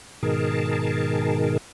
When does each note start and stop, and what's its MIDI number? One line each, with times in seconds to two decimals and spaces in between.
0.23 1.57 44
0.23 1.57 47
0.23 1.57 51
0.23 1.57 68
0.23 1.57 70
0.23 1.57 81